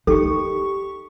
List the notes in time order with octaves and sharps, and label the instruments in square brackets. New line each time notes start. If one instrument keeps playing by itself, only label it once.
[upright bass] D#4 [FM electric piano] G4 C#6 [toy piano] A4